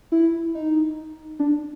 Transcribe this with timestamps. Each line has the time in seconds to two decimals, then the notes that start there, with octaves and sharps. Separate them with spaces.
0.12 E4
0.55 D#4
1.40 D4